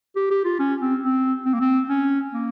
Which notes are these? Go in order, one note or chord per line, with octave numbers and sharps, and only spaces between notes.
G4
G4
F4
C#4
C4
C4
C4
A#3
C4
C#4
A#3